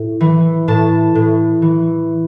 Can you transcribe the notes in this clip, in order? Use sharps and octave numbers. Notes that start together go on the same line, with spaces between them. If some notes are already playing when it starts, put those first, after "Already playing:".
Already playing: A2
E3
A2 A5
A2
E3